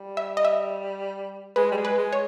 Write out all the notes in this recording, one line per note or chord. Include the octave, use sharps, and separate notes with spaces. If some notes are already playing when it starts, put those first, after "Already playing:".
Already playing: G3
E5
D#5
E5
G#3 B4
G3
G#3
B4
G#3
C#5